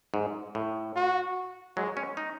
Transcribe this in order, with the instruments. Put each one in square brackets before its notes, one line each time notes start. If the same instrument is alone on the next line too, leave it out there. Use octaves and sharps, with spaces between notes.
[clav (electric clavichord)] G#2
A2
[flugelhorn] F#4
[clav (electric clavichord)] F#3 [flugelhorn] G#3
[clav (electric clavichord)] C#4
D#4